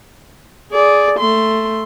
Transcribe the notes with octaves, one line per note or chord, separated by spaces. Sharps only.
G#4 D5
A3 C6